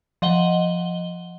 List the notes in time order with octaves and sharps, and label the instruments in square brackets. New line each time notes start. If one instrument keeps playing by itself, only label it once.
[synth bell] F3 D#5 F#5 G7